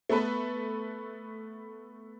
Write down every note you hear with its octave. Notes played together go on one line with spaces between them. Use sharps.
A3 B3 A4 B4